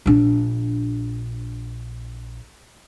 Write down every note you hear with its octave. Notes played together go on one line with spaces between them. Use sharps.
A#1 D4